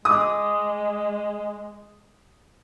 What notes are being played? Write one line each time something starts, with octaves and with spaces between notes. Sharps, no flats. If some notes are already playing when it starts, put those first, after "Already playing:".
G#3 D6 D#6